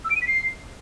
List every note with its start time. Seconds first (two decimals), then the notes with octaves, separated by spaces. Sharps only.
0.05 E6
0.10 D7
0.16 D#7
0.22 B6
0.27 C7